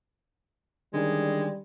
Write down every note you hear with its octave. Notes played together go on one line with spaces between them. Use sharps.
D3 D#3 G3 G#3 C#4 D#4